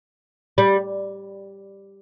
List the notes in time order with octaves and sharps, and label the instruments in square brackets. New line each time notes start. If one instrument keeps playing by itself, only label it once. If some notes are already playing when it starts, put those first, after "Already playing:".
[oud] G3